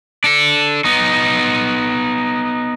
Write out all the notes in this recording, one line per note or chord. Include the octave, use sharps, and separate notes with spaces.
D4 A4
B3 D#4